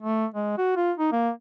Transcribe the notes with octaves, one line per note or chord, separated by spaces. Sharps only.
A3
G#3
F#4
F4
D#4
A#3